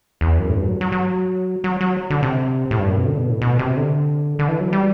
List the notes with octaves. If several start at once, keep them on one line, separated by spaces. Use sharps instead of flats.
E2
F#2
A2
G2
F#3
F#3
F#3
F#3
F#3
D3
C3
A2
G2
F#2
B2
D3
B2
A2
B2
C3
D3
D3
E3
F#3
G3